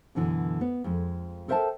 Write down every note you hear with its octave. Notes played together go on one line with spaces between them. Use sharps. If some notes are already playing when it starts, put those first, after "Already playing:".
F#2 B2 D3 E3
B3 B4
F2 G#3
A4 A#4 C5 E5 G5 A5